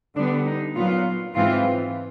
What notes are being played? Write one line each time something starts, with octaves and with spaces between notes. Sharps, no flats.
D3 G3 B3 D4
D#4
A#2 F#3 B3 F4
G#2 E3 G#3 C4 F4